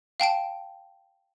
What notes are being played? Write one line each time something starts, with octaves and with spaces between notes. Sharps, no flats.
F5 G5 A5 D7